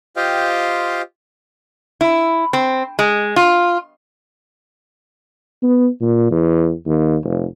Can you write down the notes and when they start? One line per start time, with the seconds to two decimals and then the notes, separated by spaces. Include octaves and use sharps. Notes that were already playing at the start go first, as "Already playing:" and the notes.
0.16 F4 G4 C5 D#5 F5 G5
2.01 E4
2.53 C4
2.99 G#3
3.36 F4
5.63 B3
6.01 A#2
6.31 E2
6.86 D#2
7.24 F1